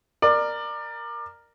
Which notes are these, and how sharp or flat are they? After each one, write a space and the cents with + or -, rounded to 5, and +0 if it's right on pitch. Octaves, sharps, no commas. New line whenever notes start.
A#4 +0 D5 +25